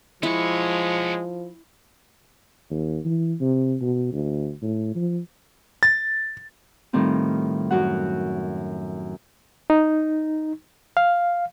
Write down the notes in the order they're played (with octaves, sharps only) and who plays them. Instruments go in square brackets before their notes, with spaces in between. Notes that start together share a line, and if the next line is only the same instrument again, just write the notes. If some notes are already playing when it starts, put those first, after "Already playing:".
[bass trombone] F3 [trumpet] G#3 [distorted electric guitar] B3 C#5 [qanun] E4
[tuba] D#2
E3
C3
B2
D2
A2
F3
[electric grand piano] A6
[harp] A2 D#3 F3 G3 C4 F4
F#2 F#4 F#5
[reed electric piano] D#4
F5